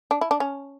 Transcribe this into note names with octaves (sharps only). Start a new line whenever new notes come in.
D4
E4
D4
C#4